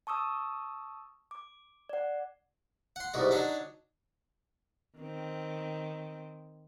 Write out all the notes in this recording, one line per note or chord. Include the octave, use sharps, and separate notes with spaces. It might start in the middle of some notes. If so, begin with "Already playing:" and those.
A5 C#6 D#6 E6
D6
D5 F#5
F#5 C6
C2 G#2 B2 F#4
F#3 D4 D#4
D#3 C4